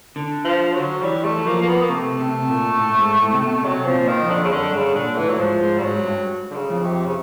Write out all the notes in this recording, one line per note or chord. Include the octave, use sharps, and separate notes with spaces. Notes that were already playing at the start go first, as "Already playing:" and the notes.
D3
F3
F#3
E3 G3
A3
F#3
F3 A#3
A#3
B3
A#3
C3 A3
C3
A#2
A2
A2
G#2
A2
C3
B2
C3 F#3
F3
A#2
D#3
F2
D3
C#3
F#2 D3
G2 C#3
A#2 D3
A2 E3
F#3
G#2 F3
G#2
G3
G#2 F#3
G2
D3
C#3
F2
C3
C#3